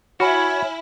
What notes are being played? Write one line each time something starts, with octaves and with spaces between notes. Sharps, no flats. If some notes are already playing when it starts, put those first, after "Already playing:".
E4 F#4 C#5 G#5 B5 F6